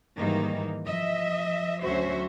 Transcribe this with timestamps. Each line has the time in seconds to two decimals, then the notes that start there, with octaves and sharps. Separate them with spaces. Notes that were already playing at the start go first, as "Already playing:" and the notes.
0.17 G#2 D#3 E3 G3 A#3 D#4
0.86 F3 D#5 E5
1.82 D2 F#3 C#4 F#4 C5 E5